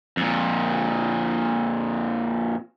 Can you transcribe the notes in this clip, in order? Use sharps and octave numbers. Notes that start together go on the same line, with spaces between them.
F2 A#2